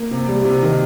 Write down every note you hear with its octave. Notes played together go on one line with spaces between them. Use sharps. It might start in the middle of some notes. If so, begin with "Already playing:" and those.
Already playing: A#3
C3
G3
C3
D#3